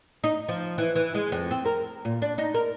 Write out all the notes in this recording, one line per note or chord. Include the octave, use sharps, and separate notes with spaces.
D#4
F3
E3
E3
G#3
F2
C4
A#4
A#2
D4
D#4
A#4